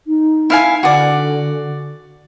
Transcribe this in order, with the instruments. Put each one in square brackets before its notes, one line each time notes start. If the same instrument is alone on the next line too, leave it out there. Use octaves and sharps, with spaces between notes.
[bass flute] D#4
[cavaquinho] E4 F5 G#5
[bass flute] D3 [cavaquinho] F#4 D5